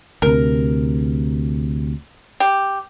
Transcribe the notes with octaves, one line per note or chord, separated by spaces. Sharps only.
D2 C3 A#4
G4